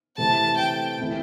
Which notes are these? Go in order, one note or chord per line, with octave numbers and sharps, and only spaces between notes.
C3 E3 A3 C4 A5
G5
C3 E3 A3 E4